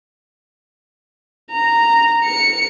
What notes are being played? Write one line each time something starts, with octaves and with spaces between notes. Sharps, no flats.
A#5
C#7